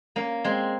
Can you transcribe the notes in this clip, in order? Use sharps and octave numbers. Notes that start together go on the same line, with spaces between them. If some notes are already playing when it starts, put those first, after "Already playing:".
A#3 C#4
G#3 C4